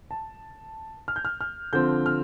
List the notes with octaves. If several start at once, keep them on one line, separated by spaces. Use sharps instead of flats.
A5
F6
G6
F6
F6
D3 F3 C4 G6
F6